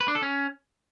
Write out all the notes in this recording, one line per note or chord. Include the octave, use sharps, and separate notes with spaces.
B4
D4
A4
C#4